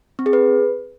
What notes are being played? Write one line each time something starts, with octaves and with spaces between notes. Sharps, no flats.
C4
G#4
B4